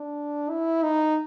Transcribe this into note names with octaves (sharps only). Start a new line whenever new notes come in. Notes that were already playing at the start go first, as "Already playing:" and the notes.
Already playing: D4
E4
D#4